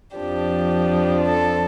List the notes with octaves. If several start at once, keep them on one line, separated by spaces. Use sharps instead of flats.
F2 F3 D4 G4
A4